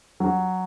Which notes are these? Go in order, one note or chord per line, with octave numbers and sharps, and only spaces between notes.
F#3